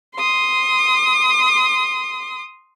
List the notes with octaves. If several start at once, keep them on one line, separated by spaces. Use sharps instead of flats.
C6 D#6